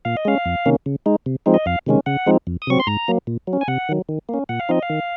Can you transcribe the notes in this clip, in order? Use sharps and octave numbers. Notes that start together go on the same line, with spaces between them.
A#2 F5
D#5
G#3 C#4 F5
F2
C3 D#3 A#3 C#4
C#3
G#3 D#4
C3
F3 G#3 C4 D#4
D#5
F2 F5
C3 D#3 G#3 C#4
C#3 F#5
F3 G#3 C4 D#4
F2
D#6
C3 F#3 C4 C#6
C6
G#2 A#5
F#3 A#3
A#2
F#3
C#4
G#5
C3 F#5
D#3 F#3
D#3
A#3 C#4
A#2 F#5
F5
F3 C4 D#4 D#5
F5
D#3